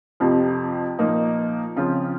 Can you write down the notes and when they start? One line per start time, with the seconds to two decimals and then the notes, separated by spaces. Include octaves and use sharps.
0.20 F2 C3 F3
0.98 A#2 F3 A#3 D#4
1.76 C#3 F3 C4 F4